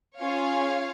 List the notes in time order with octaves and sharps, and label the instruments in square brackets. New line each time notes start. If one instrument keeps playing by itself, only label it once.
[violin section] C#4 F4 G#4 C#5 F5